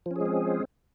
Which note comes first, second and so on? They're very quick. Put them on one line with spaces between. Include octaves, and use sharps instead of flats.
F3 C#4 G#4 G#3 C4